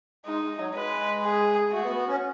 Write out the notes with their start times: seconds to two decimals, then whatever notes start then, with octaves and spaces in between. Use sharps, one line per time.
0.26 G#3 D#4
0.58 F#3
0.74 G#3 B4
1.23 G#4
1.71 A3 F#4
1.83 B3
1.96 B3
2.08 C#4